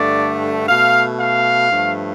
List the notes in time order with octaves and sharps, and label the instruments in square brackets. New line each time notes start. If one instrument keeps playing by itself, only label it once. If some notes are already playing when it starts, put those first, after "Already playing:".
Already playing: [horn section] G2 D3 A3 D5
B2 A3 F5
F5
G2 F3 A3